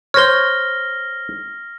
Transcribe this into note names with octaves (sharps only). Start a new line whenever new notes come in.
C5 C#5 F6 A#6 G7